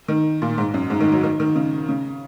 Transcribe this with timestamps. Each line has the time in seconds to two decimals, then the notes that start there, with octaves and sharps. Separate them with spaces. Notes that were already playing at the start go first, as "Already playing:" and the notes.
0.08 D#3
0.42 A#2
0.58 G#2
0.74 F#2
0.90 G#2
1.00 D#3
1.12 F#3
1.23 D#3
1.40 D#3
1.56 C#3
1.89 C#3